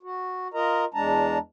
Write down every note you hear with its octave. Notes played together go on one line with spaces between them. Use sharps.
F#4
F4 A#4 D#5 A#5
E2 G#3 D4 A5 A#5